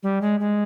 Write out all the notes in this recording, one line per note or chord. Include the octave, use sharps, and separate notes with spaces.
G3
G#3
G#3